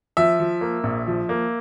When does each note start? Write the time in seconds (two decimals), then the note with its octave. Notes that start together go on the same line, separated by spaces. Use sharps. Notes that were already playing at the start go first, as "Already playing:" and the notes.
0.17 F3 E5
0.40 F3
0.61 A#3
0.84 A#1
1.07 F3
1.29 A#3